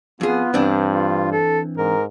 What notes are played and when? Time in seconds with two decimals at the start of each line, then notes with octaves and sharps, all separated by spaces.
0.21 F2 B3 F4 G#4
0.54 G2 E3 C4 D4
0.88 F4
1.32 A4
1.77 G#2 A#4